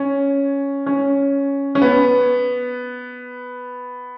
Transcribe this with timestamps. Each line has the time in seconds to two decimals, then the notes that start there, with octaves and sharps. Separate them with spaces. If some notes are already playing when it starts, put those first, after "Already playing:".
Already playing: C#4
0.86 C#4
1.75 C#4
1.82 B3